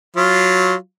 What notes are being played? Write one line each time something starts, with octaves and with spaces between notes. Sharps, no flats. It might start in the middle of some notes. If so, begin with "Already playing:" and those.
F#3 F4